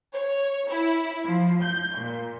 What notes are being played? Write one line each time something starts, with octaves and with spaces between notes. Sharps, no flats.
C#5
E4
F3
G6
A#2